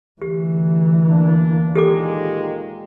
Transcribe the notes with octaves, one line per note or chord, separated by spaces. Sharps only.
D2 E3 G4
A#3 D4
A#2 D#3 G#3 G4 A4 D6